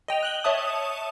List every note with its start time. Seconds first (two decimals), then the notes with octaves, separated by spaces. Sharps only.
0.08 D#5 G5 F7
0.23 F#6 F#7 G7
0.44 C#5 E5 A5 D#6